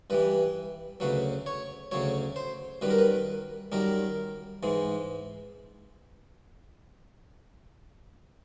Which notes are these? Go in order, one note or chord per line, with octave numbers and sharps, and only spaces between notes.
G2 E3 G3 B4
D2 C#3 F#3 B4
C#5
D2 C#3 F#3 C#5
C5
F#2 D#3 G3 B4
A#4
B4
F#2 D#3 G3 A#4
G#2 E3 G#3